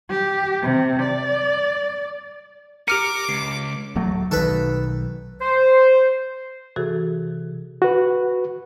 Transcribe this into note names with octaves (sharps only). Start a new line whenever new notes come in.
G4
C3
D5
G4 A#4 D6 F6 C#7 D#7
C#2 C7
D1 F#3 A3
B1 D#3 A4 B4
C5
C3 E3 F#4 G#4 A4
F#4 B4